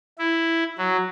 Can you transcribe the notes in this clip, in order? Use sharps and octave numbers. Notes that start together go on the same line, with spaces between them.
E4
F#3